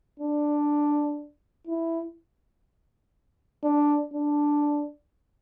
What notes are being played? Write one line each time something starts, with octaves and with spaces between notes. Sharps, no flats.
D4
E4
D4
D4